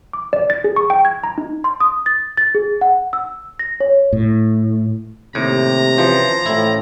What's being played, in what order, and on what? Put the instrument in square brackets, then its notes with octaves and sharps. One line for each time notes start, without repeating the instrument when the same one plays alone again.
[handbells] D6
D5
A6
G#4
C#6
G5
G#6
A#5
D#4
[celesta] C6
D#6
A6
A6
G#4
F#5
E6
A#6
C#5
[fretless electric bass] A2
[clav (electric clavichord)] D#2 A2 [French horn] C3 [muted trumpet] A#5
[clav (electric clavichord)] C#3 E3 C5 [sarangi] F3
[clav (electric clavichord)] A1 E4 [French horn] A2